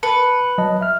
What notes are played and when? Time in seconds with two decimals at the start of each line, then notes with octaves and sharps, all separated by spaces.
0.03 B4 A5 C#7
0.58 F#3 D#5 A5
0.81 E5 F6